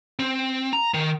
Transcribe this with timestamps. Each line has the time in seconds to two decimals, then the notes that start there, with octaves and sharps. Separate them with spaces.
0.19 C4
0.73 A#5
0.94 D#3